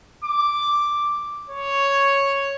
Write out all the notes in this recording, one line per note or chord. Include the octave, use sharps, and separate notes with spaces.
D6
C#5